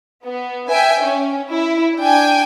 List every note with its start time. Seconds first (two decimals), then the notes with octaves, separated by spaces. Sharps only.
0.24 B3
0.70 E5 G5 G#5
1.02 C#4
1.50 E4
1.98 D4 G5 G#5